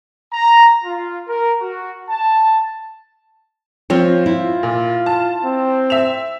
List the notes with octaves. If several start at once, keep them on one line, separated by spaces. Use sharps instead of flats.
A#5
F4
A#4
F#4
A5
F3 C4 F4 C#5
E4 F4
A#2
A5
C4
E5 E7 F7